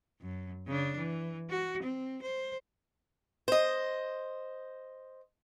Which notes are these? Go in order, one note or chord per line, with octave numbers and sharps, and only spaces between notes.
F#2
C#3 D4
E3
F#4
C4
C5
C5 D#5